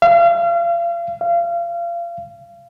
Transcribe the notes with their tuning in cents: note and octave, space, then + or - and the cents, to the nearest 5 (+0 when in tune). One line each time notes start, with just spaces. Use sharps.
F5 -35
F5 -30